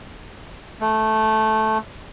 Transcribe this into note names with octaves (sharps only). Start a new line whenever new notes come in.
A3